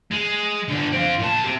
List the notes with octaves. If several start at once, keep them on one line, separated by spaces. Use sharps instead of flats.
G#3
D3 B3
C4 F4
A#2 A5
C4 G4